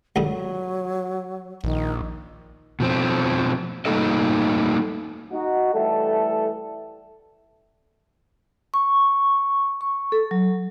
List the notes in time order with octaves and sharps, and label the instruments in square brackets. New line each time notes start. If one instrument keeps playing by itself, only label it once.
[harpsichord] C#2 G2 D3 [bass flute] F#3
[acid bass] A#1 [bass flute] D#3
[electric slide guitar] B2 F3 C4
G3 A3 A#3 D#4 A4 D#5
[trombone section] D#4 F#4
E3 G3 A3 A4
[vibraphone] C#6
C#6
A4
F#3